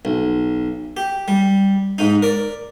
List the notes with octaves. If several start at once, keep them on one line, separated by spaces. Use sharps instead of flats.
B1
G4
G3
G#2 D#4
A#4 D5